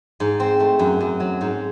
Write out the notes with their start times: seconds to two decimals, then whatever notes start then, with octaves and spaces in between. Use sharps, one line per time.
0.20 G#2
0.40 C4
0.60 A3
0.79 F#2
1.01 F#2
1.20 F#3
1.41 G#2